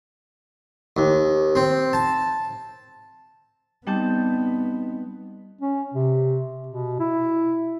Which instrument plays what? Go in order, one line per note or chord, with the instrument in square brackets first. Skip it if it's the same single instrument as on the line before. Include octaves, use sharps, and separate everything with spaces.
[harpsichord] D#2
C4
A5
[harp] G3 A5 G6 [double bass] B3 [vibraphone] C4 D#4 D#5
[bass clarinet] C#4
C3
B2
E4